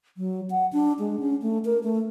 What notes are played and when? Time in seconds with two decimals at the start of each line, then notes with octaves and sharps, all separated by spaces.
0.17 F#3
0.50 F#5
0.73 D4
0.99 G#3
1.20 C#4
1.42 A3
1.65 A#4
1.83 A3